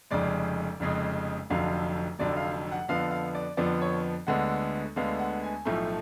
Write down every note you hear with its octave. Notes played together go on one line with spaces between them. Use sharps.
F1 F2 C#3 G#3 D5
F1 F2 C#3 G#3
F1 F2 D3 F#3 F5
F1 F2 D3 F#3 D5
F5
F#5
F2 D3 F3 B3 F5
F5
D5
F2 D3 F3 B3 D5
C#5
D2 D3 G#3 B3 F#5
D2 D3 G#3 B3 F5
F#5
G#5
B1 A2 F3 A3